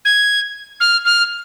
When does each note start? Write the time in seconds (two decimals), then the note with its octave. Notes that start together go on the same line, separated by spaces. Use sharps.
0.05 G#6
0.80 F6
1.05 F6